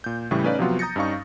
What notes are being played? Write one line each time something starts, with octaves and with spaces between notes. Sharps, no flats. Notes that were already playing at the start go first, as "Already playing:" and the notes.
A#2 G6
A2 C#3 E3 G3 G#4 C#6
A3 C#4 D#4 B4 D5 F5
C3 F3 F#3 B3 F4 F#4
A#5 D#6 G6 A6 A#6 C#7
G2 C#4 D#4 F5 C#6